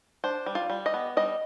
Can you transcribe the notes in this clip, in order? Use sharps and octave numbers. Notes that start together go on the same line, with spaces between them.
D4 C5
G3
F4
G3
D#5
B3
G3 D#5